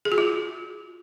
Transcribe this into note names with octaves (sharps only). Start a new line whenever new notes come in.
G#4
F#4
F4